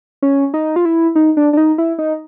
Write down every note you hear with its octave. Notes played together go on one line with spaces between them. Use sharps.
C#4
D#4
F4
E4
D#4
D4
D4
D#4
E4
D#4